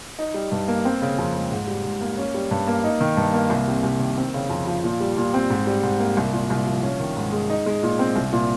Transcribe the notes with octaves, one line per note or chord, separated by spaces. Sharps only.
D#4
G3
G2
A#3
C4
C#3
F2
G#3
G#2
G3
G#2
A#3
C#4
G3
G2
A#3
D#4
D#3
G2
A#3
C2
C3
C2
D#3
C4
C#3
F2
F3
A#2
G3
A#2
C4
G#2
G3
G#2
A#3
C2
A#2
C2
F3
C#4
D#3
G#2
G#3
D#4
G#3
A#2
C4
C2
A#2